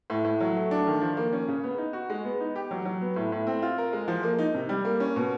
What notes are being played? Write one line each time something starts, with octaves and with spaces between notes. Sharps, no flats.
A2
A2
F#3
A3
D4
D#3
F3
A#3
C#4
C#3
B3
D#4
F#4
G#3
B3
D#4
G4
F#3
F#3
B3
A2
A2
C4
F4
A#4
G#3
F3
A#3
D#4
C3
G3
A#3
C#4
B2